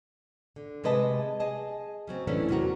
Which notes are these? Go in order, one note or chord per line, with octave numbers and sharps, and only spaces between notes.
D3
C3 G#3 B4 D#5 A5
G#4 D#5 A5
C#3 F#3 C4
E3 A3 B3 C#4 D4 E4
E2 C3 F#3 C4 F#4 A#4